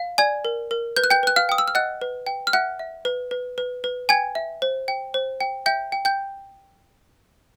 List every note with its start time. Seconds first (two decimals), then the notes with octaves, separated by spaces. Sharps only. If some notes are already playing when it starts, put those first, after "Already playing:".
Already playing: F5
0.18 D5 G#5 G#6
0.45 A#4
0.71 A#4
0.96 B4 G6
1.04 F#6
1.10 G5 G6
1.23 B4 F#6
1.36 F5 F6
1.49 G5 D#6
1.58 E6
1.68 F6
1.75 D#5 F#5 F#6
2.01 B4
2.27 G5
2.47 F6
2.53 E5 F#5 F#6
2.79 E5
3.05 B4
3.31 B4
3.58 B4
3.84 B4
4.09 G5 G#5 G#6
4.35 E5
4.62 C5
4.88 G5
5.14 C5
5.41 G5
5.66 E5 G5 G6
5.92 G5
6.05 G5 G6